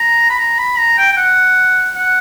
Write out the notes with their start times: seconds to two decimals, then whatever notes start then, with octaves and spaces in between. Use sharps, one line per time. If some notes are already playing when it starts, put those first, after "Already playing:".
Already playing: A#5
0.30 B5
0.39 A#5
0.58 B5
0.78 A#5
0.97 G5
1.12 G5
1.17 F#5
1.95 F#5